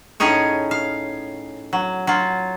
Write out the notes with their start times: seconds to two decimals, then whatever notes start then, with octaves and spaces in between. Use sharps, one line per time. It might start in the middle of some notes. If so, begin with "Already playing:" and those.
0.20 A2 C#4 D#4 G#4 C#5
0.71 F5
1.73 F#3
2.07 F#3 F4